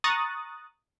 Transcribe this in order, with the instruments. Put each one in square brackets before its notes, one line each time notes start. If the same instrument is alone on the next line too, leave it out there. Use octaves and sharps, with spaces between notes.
[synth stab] A#5 C#6 D#6 F#6 A6